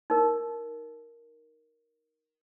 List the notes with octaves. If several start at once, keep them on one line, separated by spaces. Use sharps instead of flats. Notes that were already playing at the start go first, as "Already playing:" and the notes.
D#4 A#4